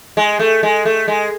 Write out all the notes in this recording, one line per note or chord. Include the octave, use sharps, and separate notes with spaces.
G#3
A3
G#3
A3
G#3